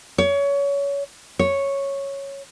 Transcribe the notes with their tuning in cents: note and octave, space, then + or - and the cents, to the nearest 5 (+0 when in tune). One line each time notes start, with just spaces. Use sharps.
C#5 +25
C#5 -5